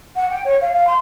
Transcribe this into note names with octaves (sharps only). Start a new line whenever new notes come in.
F#5
G5
C#5
F5
F5
C6